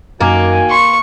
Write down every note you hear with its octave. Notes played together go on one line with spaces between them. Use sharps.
F#2 D#3 A#3 F#4 G#5 D6
C6 C#6